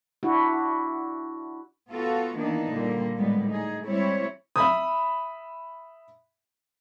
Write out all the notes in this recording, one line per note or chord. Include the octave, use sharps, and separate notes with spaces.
D4 E4 F#4
B3 F4 F#4 A4
D#3 E3 A#3 B3 D4 D#4
A#2 D3 G3 A#3
D2 A2 G3 G#3 B3
D#4 G#4
G3 G#3 C4 E4 C#5
E5 B5 D#6